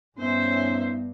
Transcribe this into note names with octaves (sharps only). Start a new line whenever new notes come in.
G2 B3 C#4 D#4 C5 E5